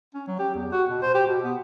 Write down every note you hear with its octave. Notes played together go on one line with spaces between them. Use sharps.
C#4
F#3
G4
E2
F#4
B2
C5
G4
B2
B3